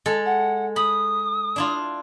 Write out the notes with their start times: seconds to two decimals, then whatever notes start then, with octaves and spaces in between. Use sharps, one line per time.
0.06 G#3 A4
0.25 F#5
0.76 B5 D#6
1.56 D4 E4 F4